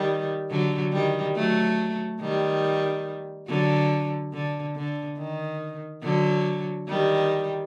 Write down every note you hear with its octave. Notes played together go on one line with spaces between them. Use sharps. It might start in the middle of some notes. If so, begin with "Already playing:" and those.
Already playing: D#3 G3
D3 F#3
D#3 G3
F#3 A3
D#3 G3
D3 F#3
D3
D3
D#3
D3 F#3
D#3 G3